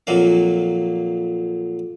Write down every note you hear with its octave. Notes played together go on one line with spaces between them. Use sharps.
F2 A#2 F#3 A#3 F5